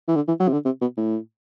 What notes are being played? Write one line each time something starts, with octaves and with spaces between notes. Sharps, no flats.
E3
D3
E3
F#3
C3
D3
C3
B2
A2